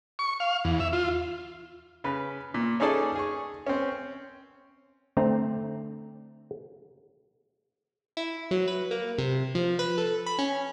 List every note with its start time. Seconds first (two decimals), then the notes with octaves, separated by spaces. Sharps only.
0.19 C#6
0.40 F5
0.64 E2
0.80 E5
0.93 F4
2.04 C#3 B4
2.54 A#2
2.80 C#4 D#4 G#4 A4 D5 A5
3.15 G#4 C#6
3.67 C4 C#4
5.17 D3 A3 C4 A#5
8.17 E4
8.51 F#3
8.68 B4
8.91 A#3
9.18 C3
9.55 F3
9.79 B4
9.98 A4
10.26 B5
10.38 C#4